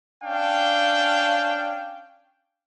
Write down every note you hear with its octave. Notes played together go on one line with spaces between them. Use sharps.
C#4 D4 F5 G5